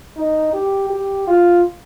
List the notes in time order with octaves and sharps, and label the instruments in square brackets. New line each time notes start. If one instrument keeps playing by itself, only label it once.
[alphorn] D#4
G4
G4
F4